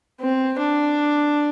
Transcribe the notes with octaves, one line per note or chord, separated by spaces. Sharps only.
C4
D4